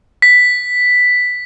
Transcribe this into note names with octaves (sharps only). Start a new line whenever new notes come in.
B6